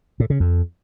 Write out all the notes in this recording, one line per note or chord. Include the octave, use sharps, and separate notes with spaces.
A2
C#3
F2